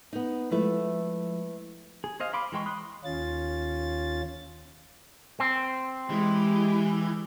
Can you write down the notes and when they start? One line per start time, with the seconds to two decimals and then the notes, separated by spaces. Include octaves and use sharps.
0.13 B3 D#4
0.51 F3 G#3 A3 E4 B4 E5
2.04 G#4
2.20 G#4 C5 D#5 F5
2.33 F5 B5 C6 D6
2.52 E3 G#3 G5 C6 C#6
2.66 B5 C6 D#6 F#6
3.05 D#2 C#4 F4 A6
5.40 C4
6.10 E3 G#3 G4